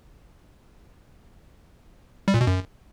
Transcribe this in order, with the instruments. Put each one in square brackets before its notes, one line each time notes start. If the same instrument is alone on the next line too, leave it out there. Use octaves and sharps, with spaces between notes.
[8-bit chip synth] G3
A#2
B2
F#2